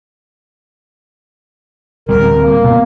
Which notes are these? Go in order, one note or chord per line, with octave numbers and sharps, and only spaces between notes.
D1 G3 C4 A#4
A#3
B2